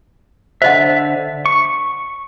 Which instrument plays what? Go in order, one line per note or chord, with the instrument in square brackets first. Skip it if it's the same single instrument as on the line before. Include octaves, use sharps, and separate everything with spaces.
[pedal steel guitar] D3 E5 [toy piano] C5 D#5 F#5
[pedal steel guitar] C#6